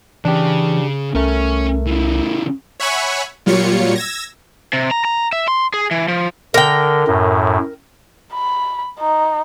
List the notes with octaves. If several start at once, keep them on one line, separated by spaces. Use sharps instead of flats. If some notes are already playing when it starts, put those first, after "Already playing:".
C#3 E3 D4 G4
C2 A3 C#4 A#4
C#3 E3
C#5 E5 F#5 G#5 B5 C#6
A#2 F#3 G3 F4 C#5 C#7
E6 G#6 A#6
C3
A#5
A#5
E5
C6
G#4
E3
F3
D3 A#4 G5
F#2 A2
B5
D#4